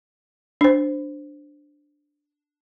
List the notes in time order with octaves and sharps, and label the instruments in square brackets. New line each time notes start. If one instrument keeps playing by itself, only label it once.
[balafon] D4 C5